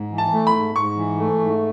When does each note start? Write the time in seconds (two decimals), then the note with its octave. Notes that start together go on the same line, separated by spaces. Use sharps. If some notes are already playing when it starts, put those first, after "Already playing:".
Already playing: G#2
0.11 E3
0.18 A5
0.33 A3
0.47 B5
0.54 G#2
0.75 G#2 C#6
0.97 E3
1.19 A3
1.40 G#2